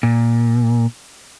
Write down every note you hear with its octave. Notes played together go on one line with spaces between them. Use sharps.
A#2